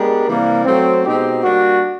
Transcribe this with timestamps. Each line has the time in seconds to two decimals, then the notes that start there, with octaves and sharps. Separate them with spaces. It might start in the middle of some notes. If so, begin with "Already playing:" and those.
Already playing: G#3 B3 D4 G4 A#4
0.27 C3 E3 G3 A#3
0.65 F#3 A3 C4
1.04 B2 G#3 C4 D#4 G4
1.43 G3 A#3 D4 F#4